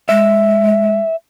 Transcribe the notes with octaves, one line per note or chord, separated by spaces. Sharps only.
G#3 E5